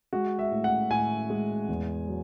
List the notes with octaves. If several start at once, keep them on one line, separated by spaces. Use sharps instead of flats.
G#3 F#4
E5
A2
F#5
A2 G#5
G#3
E2
F#3